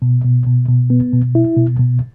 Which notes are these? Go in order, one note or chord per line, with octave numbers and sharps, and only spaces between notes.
B2
B2
B2
B2
B3
B2
E4
B2
B2